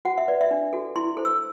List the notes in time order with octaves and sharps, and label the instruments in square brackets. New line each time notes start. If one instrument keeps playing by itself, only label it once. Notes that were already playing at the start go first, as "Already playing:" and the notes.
[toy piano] F#4 F#5
E5
B4 D5
E5
D4
F#4 A4
E4 C6
A4 C5
E6